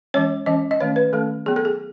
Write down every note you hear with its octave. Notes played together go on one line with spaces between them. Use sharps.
E3 G#3 C#4 C#5
E3 G#3 C#4 D#5
D#5
D#3 A3 C#4 C#5
B4
D#3 A3 C#4 A4
F#3 B3 G#4
A4
G#4